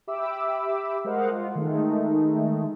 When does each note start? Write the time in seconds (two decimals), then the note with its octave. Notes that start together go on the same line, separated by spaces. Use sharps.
0.07 G4 E5 B5 D6 E6
1.04 G#3 A#4 C5 D#5 F5 F#5
1.32 F4 F5
1.55 D#3 G#3 A3 D#4